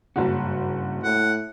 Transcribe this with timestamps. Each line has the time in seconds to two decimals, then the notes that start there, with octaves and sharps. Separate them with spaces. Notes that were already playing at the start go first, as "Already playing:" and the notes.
0.16 F#1 G2 C#3 C#4 F#4
1.04 A2 F#5